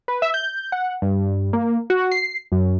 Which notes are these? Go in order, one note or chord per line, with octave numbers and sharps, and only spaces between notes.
B4
E5
G6
F#5
G2
A#3
F#4
C7
F#2